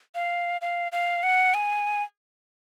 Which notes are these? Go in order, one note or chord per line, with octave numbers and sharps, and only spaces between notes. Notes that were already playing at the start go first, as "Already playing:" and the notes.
F5
F5
F5
F#5
G#5